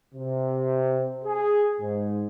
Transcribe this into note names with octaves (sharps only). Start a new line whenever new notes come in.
C3
G#4
G#2